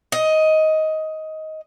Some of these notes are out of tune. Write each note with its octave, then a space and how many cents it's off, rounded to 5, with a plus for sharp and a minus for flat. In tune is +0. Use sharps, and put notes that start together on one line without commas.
D#5 +15